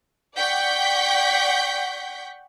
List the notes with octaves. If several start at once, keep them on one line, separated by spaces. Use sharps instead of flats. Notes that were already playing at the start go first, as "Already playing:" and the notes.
D5 F#5 G5 C#6 G6 B6